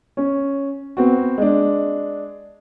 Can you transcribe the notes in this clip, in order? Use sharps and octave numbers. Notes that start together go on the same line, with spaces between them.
C#4
B3 C4 F#4
G#3 D4